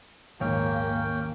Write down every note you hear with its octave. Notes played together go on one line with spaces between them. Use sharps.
A#1 D#2 G#2 A#3 C#4 C#5 G5